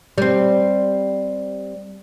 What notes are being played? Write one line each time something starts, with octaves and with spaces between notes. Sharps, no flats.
G3 C4